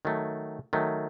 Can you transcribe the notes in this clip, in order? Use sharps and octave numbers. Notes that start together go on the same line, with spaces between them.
D#3 F#3 A3
D#3 F#3 A3